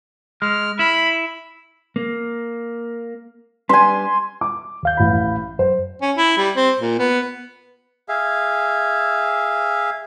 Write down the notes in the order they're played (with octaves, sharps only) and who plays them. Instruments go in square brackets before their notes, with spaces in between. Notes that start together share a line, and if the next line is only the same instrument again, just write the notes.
[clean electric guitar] G#3 [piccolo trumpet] F6
[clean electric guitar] E4 [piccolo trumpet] B5
[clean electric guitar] A#3
[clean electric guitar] G3 D4 B4 [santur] G#5 C6
[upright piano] D6
[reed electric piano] D#2 F5 G6
[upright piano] A1 B5
[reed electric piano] F#2 [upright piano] C5
[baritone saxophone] C#4
E4
G3
C4
A#2
B3
[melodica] G#4 E5 F5